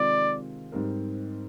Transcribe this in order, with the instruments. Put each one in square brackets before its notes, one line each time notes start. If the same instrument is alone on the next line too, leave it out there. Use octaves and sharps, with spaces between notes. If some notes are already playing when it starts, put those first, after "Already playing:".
Already playing: [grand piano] C3 D#3 G#3 C4 F4 [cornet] D5
[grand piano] G#2 G3 C4 D#4 A#4